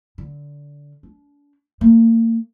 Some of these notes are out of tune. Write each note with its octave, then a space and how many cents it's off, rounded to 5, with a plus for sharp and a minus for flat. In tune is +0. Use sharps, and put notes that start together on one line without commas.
D3 -20
D4 -35
A#3 -35